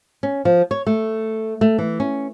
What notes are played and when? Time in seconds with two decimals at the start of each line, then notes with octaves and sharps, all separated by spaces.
0.23 C#4
0.45 F3
0.71 C#5
0.87 A3
1.61 A3
1.78 E3
2.00 C#4